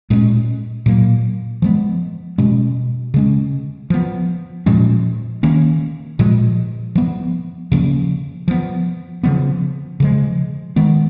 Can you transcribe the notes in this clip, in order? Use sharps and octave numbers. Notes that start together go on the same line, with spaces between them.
A#2 G#3 C#4
A#2 F#3 A#3
F3 G#3 B3
B2 G#3 C#4
C#3 G#3 C#4
F3 B3
A#2 F3 G#3 C#4
D#3 A#3 C#4
A#2 F3 G#3
F3 B3
C#3 F3 A#3 C#4
F3 B3
C#3 F3 B3
C#3 F3 G#3
D#3 G#3 B3